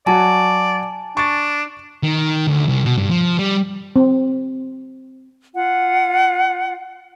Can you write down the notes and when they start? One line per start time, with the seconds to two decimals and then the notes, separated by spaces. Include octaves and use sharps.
0.06 F#3 F#4 D5 G#5 A5
1.17 D4 C#6 A6
2.03 D#3
2.47 D2
2.68 C2
2.85 B2
2.97 G2
3.10 F3
3.39 G3
3.96 C4
5.55 F4 F#5